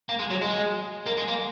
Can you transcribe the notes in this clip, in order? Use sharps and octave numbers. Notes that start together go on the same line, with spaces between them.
A#3
G#3
F#3
G#3
A#3
G#3
A#3